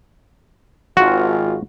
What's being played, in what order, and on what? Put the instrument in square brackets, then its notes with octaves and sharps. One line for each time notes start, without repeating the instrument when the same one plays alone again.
[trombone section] G#1 F4 [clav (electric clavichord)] F#4